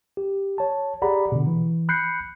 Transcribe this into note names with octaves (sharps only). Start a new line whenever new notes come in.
G4
C#5 A5
G4 G#4 D5 F#5 A#5 B5
B2 D3
E3
B5 F#6 G6 C7 C#7